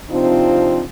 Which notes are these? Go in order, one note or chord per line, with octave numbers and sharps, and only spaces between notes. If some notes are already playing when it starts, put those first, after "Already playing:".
C3 F3 C4 D4 D#4 F4